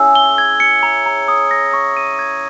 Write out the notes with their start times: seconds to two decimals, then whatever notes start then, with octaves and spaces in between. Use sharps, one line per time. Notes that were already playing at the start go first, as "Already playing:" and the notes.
Already playing: C#4 E4 G#4 E6
0.15 G7
0.38 G#6
0.60 C#7
0.83 A#5
1.06 A#5
1.28 D#6
1.51 A#6
1.73 C#6
1.97 D#7
2.19 G#6